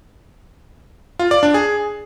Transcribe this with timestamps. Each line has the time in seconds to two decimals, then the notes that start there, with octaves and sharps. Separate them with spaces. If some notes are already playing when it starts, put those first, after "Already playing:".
1.19 F4
1.31 D5
1.43 D4
1.54 G#4